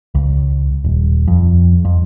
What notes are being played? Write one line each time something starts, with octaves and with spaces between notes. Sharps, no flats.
C#2
D#1
F2
F2